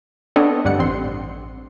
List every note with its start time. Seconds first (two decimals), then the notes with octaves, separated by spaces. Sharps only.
0.36 B3 C4 D4 A4 C#5 D#5
0.65 D2 G2 G3 F#5 C#7
0.79 A1 C4 C6